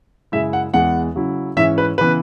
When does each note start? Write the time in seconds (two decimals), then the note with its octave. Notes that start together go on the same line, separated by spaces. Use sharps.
0.32 F#2 C#3 G#3 E4 E5
0.53 F#5
0.74 E2 E3 G#3 F#5
1.15 C#3 F#3 E4
1.57 G#2 E3 C#4 E4 E5
1.78 B4
1.98 C#3 E3 B3 B4